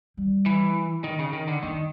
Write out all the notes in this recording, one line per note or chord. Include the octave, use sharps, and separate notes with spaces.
G3
E3
D#3
C#3
D#3
D3
D#3 A#3